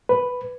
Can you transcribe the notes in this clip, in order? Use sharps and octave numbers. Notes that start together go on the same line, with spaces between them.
B4